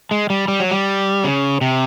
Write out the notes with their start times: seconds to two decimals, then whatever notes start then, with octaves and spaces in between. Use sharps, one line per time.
0.11 G#3
0.30 G3
0.48 G3
0.60 F#3
0.71 G3
1.24 C#3
1.61 C3